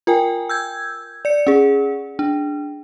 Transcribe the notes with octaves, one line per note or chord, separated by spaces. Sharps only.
F4 A#4 G5 G#5
E6 G6 G#6
D5 C#7
C#4 G#4
D4